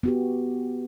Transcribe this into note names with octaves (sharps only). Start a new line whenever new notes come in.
B3 F#4 G4